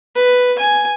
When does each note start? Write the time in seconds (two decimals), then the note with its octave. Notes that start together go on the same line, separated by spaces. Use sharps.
0.16 B4
0.59 G#5